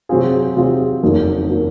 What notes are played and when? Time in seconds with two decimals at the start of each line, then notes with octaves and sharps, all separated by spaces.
0.09 C3 F#3 C4 F4 G#4
0.56 C3 F#3 C4 F4 G#4
1.03 F#1 F2 D#3 F#3 A#3
1.49 D#3 F#3 A#3